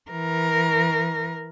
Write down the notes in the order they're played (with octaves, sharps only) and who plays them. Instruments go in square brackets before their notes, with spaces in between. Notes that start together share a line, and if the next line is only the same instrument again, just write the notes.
[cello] E3 A#4